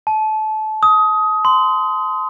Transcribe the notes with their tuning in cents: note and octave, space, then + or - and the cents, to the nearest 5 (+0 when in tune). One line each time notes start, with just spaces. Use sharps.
A5 -25
D#6 +20
C6 -20